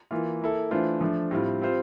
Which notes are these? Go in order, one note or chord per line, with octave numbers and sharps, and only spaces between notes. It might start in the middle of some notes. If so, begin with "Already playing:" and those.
E3 A#3 F4
A#3 E4 A4
E3 A3 D4 F4 C5
F3 A3 D4
A2 G3 C4 F4
G3 C4 F4 C5